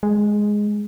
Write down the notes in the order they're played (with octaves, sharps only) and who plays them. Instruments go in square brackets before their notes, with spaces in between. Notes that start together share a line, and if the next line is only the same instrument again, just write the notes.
[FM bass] G#3